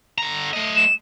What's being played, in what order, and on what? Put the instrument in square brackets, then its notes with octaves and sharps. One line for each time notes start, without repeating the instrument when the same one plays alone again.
[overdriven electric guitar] D3 A#5
A3 D#5
[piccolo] E7